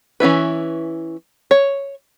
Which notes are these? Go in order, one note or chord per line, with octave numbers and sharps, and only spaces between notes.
E3 C#4 E4 B4
C#5